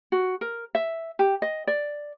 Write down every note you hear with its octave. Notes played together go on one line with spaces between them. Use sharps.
F#4
A#4
E5
G4
D#5
D5